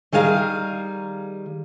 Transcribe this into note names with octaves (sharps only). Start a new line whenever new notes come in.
D#3 G3 G#4 F5 A5 A#5